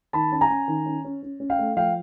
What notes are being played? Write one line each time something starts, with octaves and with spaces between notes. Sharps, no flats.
D#3 A5 B5
C#4 A5
G#5 A#5
C#4
D#3
C#4
C#4
C#4
C#4
F5 G5
A3
F3 F5 G5